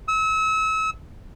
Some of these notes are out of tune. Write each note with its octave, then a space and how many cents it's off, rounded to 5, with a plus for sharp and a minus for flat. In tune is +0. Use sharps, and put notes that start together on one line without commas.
E6 -35